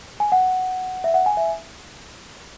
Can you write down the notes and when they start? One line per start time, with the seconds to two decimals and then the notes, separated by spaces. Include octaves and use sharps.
0.20 G#5
0.32 F#5
1.04 E5
1.14 F#5
1.26 G#5
1.37 E5